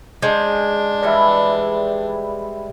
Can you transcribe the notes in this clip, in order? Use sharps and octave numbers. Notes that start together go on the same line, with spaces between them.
G#3 D4 C5
E3 G3 E4 D5 E5